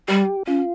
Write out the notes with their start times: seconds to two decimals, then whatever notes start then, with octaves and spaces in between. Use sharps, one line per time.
0.08 G3 G4
0.47 C#4 F4